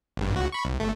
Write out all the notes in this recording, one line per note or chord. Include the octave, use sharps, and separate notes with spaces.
G#1 G2
C#2 F#4
B5 C#6
C2
G1 A3